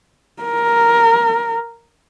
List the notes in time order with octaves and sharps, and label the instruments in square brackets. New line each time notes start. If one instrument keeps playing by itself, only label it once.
[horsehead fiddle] A#4